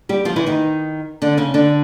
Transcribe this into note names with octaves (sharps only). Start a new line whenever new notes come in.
G3 G4
F3 F4
E3 E4
D#3 D#4
D3 D4
C#3 C#4
D3 D4